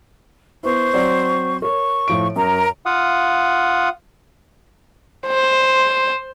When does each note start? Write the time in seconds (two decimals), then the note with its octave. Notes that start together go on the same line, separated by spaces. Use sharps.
0.63 B3 E4 C5 C#6
0.94 F#3 C4 D5
1.62 A#4 C#5 C#6
2.08 A2 F3 D7
2.36 F#2 A#4 A#5
2.86 F4 F5 F#5 D#6
5.27 C5